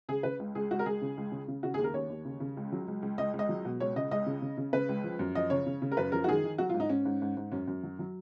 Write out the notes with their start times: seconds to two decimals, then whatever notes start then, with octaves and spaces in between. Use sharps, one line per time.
0.09 C#3 G#4
0.23 C#3 B4
0.39 C#2
0.55 C#2 G#4
0.71 C#2 F#4
0.79 A#4
0.86 C#2 G#4
1.02 C#3
1.17 C#2
1.32 C#3
1.48 C#3
1.63 C#3 F#4
1.74 G#4
1.79 D#2
1.84 A#4
1.94 D#2 C#5
2.10 D#2
2.25 C#3
2.40 C#3
2.57 C#2
2.72 F#3
2.88 C#2
3.02 C#2
3.18 C#2 D#5
3.33 C#2
3.39 D#5
3.49 F#3
3.65 B2
3.80 C#2 C#5
3.96 C#3 D#5
4.11 C#2 D#5
4.26 C#3
4.42 C#3
4.57 C#3
4.73 C#3 B4
4.89 C#2
5.04 F3
5.19 F#2
5.35 F3 D#5
5.50 C#3 C#5
5.66 C#3
5.82 C#3
5.92 A#4
5.97 F#2 B4
6.12 F3 A#4
6.24 F#4
6.27 D#3 G#4
6.44 D#3
6.58 F#3 F#4
6.69 F4
6.74 G#2
6.80 D#4
6.89 G#2 C#4
7.05 G#2
7.22 G#2
7.37 G#2
7.52 F#2 C#4
7.68 F#2
7.83 F#3
7.99 F#3